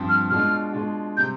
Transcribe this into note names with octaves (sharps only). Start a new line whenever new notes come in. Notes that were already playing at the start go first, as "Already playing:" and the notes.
Already playing: G2 F3 C4
F6
B2 G#3 D4 F4 F6
B2 G#3 D4 F4
C3 G3 C4 G6